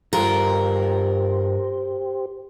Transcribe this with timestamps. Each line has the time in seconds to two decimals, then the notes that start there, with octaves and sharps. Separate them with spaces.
0.13 G2 F4 G4 A#4 C5